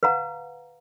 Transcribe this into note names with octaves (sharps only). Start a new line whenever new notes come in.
B4 F5 F#5 A#5